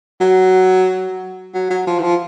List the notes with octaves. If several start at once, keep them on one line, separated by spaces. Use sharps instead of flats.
F#3
F#3
F#3
F3
E3
F3